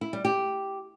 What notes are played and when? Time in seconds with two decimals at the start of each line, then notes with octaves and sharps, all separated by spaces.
0.01 E4
0.13 G3
0.25 G4